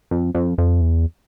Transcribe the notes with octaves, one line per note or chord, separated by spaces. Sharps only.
F2
F2
F2
E2